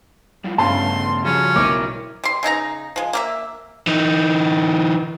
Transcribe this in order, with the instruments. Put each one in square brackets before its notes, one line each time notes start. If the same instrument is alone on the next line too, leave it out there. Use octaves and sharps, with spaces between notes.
[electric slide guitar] G3 E4 F4
[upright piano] G2 C#4 F5 [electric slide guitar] C#3 A3 B3 [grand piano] A5 [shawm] C6
[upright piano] C#3 [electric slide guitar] F3 G3 F#4 [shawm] C#4
[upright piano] B1 [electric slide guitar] E4 A#4 [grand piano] D6
[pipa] G3 C6
C#3 D#4 E4 A#5
F3 G#3
A#3 G4 E5
[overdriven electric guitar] E3 D#4